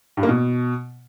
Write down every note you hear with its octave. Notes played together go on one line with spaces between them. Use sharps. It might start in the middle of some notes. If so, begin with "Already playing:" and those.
G2
A#3
B2